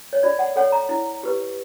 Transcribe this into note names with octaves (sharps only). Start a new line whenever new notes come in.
C#5
F4 D5
F#5
A4 C#5 F#5
A#5
E4
G4 B4